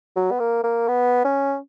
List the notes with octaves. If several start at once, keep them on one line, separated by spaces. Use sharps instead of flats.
F#3
B3
A#3
A#3
B3
C#4